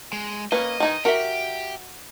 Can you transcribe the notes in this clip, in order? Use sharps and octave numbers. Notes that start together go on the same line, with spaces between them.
G#3
A#3 C#4 B4 D#5
D#3 D#4 G#5
F#4 G4 A#4 E5 A#5